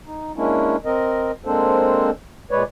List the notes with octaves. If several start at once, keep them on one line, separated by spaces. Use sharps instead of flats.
D#4
G#3 A#3 C#4 D4 E4
C4 A#4 D#5
G#3 A#3 C4 D4 A4 C5
A#2 G#3 B4 C#5 D5